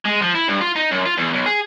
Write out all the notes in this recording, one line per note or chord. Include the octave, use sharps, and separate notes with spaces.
G#3
F3
E4
G2
F4
D#4
F#2
F4
E2
B1
G#4